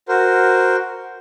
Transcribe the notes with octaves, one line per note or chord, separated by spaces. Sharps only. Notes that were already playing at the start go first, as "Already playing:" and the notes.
F#4 A#4 C5